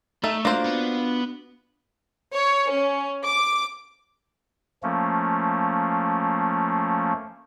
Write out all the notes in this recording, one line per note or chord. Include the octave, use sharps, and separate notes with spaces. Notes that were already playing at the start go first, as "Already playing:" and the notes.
A3 D#4 A4 E5
A#3 D4 F4 F#4 C5
B3
C#5
C#4
D6
F3 A3 A#3 C#4